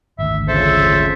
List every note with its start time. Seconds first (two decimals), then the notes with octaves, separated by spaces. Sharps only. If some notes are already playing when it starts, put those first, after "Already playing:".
0.19 G#1 D2 E5
0.48 F2 C#3 A4 C5 E5